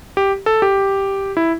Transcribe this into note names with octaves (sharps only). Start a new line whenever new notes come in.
G4
A4
G4
E4